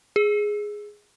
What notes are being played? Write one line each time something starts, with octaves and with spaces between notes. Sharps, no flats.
G#4